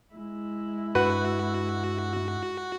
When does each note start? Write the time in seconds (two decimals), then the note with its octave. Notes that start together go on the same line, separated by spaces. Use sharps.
0.13 G#3 E4
0.95 G2 F#4 B4 F#5